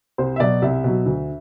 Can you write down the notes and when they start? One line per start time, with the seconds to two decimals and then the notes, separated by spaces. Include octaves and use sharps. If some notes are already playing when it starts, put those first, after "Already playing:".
0.18 C2 C5
0.36 E5
0.40 B2 F#3 D5
0.62 C2 E5
0.84 B2 F#3
1.06 D2